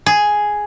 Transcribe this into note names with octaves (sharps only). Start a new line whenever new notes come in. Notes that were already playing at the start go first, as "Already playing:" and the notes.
G#4